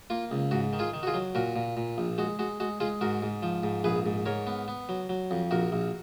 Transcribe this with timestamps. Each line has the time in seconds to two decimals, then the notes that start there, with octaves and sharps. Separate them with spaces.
0.10 A#3 F4
0.31 C#2
0.51 G#2 F#4
0.73 D#3
0.79 F4 G#4
0.94 D#3
1.03 F#4
1.07 F4 G#4
1.14 F#3
1.35 A#2 F#4 A#4
1.56 A#2
1.77 A#2
1.98 A#1
2.18 G#3 F#4
2.39 G#3 F#4
2.60 G#3 F#4
2.80 G#3 F4 G#4
3.01 G#2 F#4 A#4
3.22 G#2
3.43 F3
3.63 G#2
3.84 A#1 G#4 B4
4.06 G#2
4.26 G#2 A#4 C#5
4.47 B3
4.68 B3
4.89 F#3
5.09 F#3
5.31 F2
5.51 A#1 F#4 A#4
5.72 A#1